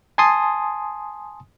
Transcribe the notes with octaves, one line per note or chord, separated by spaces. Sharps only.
G#5 A5 C6 D#6